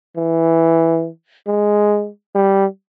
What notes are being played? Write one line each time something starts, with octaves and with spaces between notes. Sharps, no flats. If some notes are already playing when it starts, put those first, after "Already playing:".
E3
G#3
G3